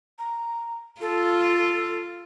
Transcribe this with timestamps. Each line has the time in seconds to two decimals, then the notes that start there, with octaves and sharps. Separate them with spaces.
0.19 A#5
1.01 F4 A4